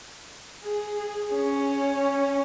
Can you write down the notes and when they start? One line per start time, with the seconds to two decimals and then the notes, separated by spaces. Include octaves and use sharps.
0.63 G#4
1.34 C#4